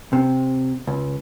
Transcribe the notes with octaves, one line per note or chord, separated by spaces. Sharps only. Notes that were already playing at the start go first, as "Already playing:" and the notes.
C3
C#2